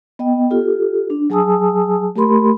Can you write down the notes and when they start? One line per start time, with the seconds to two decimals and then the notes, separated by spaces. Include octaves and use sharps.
0.19 B3 D#5 G5
0.50 F4 G4 A4
1.10 D4
1.30 F#3 G#4 G#5 A5 D#6 E6
2.16 A3 G4 A#4 B5 C6